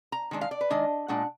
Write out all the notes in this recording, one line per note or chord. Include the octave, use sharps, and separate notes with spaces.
A#5
D#3 G#3 D4
F5
D5
B4
D#3 G#3 D4 D#5
A#2 G#3 D4 F#5